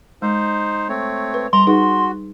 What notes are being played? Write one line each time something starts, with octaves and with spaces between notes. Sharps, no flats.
G#3 D#4 C5
A3 C4 C#5
B4
G3 A#5 C6
D#4 F#4 G#4 B4